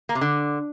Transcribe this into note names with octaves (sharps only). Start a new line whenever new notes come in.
A#3
C3
D3